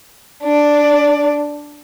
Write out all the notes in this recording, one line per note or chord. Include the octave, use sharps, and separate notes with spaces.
D4 D5